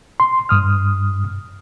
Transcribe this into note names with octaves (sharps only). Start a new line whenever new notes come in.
C6
G2 D#6 F6